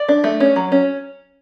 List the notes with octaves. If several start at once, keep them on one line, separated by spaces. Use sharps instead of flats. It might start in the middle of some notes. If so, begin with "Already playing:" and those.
Already playing: D5
D4
A3
C#4
F#3
C#4